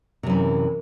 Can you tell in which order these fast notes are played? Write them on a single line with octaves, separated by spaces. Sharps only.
C3 F#2 E3